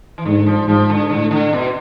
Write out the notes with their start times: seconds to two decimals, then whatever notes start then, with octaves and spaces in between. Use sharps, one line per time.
0.18 E3
0.25 G#2 D3
0.46 F3
0.68 G#2 F3
0.90 D3
1.10 A2 D3
1.31 D3
1.53 B2